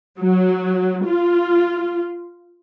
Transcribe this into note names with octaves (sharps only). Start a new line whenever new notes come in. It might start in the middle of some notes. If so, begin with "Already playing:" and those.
F#3
F4